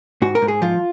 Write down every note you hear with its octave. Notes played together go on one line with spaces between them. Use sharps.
G#2 F#4
A#4
G#2
G#4
F3 F4